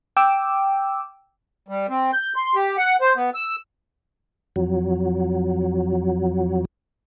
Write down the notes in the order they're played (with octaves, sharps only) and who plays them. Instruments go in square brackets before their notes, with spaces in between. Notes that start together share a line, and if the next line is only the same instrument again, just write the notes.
[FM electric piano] G5 D6 E6
[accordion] G3
C4
G6
C6
G4
F#5
C5
B3
E6
[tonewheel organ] F2 F#3